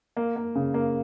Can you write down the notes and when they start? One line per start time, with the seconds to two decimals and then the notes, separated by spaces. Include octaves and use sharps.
0.17 A#3
0.36 A#3
0.55 C#3
0.74 A#3